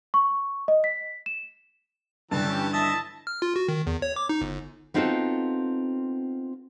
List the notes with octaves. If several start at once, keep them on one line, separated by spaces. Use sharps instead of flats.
C#6
D#5
B6
E7
G2 D3 E3 C#4 G4 A4 A5
E4 D#5 E5 A5
F6
F4
F#4
D#3
E2
C#5
D6
D#4
G1
B3 C4 D#4 F4 F#4 A4